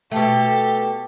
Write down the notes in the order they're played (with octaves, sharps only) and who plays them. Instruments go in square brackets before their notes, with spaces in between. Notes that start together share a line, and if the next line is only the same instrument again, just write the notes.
[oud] B2 A3 [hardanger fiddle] G4 A4